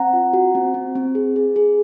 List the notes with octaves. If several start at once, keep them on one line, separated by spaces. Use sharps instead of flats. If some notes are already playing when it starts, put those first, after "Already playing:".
Already playing: C4 F#5 A#5
F4
F#4
C4
C4
C4
G#4
G#4
G#4